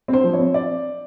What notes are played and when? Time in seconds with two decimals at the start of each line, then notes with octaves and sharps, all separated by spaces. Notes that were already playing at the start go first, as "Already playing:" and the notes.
0.08 C4
0.13 C5
0.24 F3
0.33 C#5
0.39 C4
0.54 D5